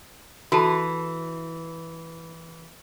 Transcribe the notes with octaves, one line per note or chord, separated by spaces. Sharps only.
E3 F#4 A4 A5